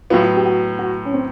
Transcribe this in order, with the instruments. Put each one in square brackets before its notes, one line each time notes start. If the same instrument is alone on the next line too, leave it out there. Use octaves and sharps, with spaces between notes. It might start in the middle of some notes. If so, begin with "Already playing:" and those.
[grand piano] A2 F#3 B3 [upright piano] F4
[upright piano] G4
F#4
F#4
C#4
C4